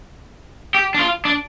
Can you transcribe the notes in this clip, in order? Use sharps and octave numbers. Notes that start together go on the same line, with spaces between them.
G4
D4
F4
D4